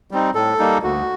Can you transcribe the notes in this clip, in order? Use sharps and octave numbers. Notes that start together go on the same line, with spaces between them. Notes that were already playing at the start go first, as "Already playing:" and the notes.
G3 C4 D#4
A2 A4
G3 A#3 D#4
D2 F#4